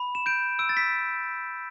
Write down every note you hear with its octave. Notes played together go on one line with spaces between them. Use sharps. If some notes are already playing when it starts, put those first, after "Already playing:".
Already playing: B5
E7
G6 D7
E6 D7
A6
B6